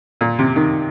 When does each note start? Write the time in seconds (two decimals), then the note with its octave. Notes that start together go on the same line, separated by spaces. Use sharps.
0.21 A#2
0.39 C3
0.56 D#3